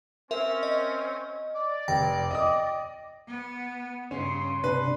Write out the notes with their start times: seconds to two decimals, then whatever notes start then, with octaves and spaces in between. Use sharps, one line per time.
0.31 C4 C#4 A#4 E5
0.63 D#5
1.56 D5
1.88 F1 G5 A#6
2.31 D#5 D#6
3.28 B3
4.11 G2 C#3 C#4 C6
4.64 C3 D4 B4